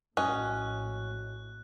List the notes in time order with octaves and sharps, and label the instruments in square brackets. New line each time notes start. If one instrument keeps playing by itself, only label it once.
[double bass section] A#1 A2 [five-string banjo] C#4 [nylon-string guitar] F#4 D#5 [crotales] F#6